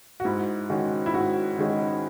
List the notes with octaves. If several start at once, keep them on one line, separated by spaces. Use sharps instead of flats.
F#4
G#2 E4
D#3 G#3 C#4 F#4
E4
G#2 F#4
D#3 G#3 C#4